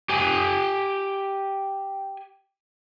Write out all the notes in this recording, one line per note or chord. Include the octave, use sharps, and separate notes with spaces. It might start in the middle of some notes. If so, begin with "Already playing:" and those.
G4 G#5